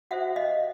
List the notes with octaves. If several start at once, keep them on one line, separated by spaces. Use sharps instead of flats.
F#4 A4 C5 E5 F#5
D#5 F5